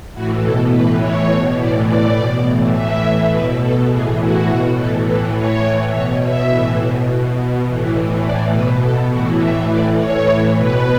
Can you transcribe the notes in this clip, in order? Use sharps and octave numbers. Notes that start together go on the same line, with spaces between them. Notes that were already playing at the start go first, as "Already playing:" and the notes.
A2 E3 F#4
B2 A4
A2 E3 B4
A2 E3 C#5
B2
A2 E3 D5
A2 E3 D5
B2
A2 E3
A2 E3 E5
A2 E3
B2 B4
B2 A4
A2 E3 G#4
A2 E3 F#4
B2
A2 E3 A4
A2 E3 B4
A2 E3 C#5
A2 E3
B2 C#5
B2 E5
A2 E3
B2
B2
B2
A2 E3
A2 E3
A2 E3 D5
B2 B4
B2 A4
A2 E3 F#4
A2 E3 E5
A2 E3 D5
A2 E3 C#5
A2 E3
B2 B4